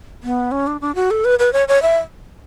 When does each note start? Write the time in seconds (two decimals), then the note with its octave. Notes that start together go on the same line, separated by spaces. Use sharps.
0.23 B3
0.52 C#4
0.67 D4
0.81 D4
0.95 F#4
1.11 A4
1.25 B4
1.39 B4
1.53 C#5
1.68 C#5
1.82 E5